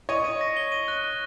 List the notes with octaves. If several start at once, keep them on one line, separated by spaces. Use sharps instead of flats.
C#5 D#5 D#7
D#7
A#6
G7
D#7
F#6
F#6